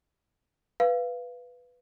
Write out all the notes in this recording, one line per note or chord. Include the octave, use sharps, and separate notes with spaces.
B4 F5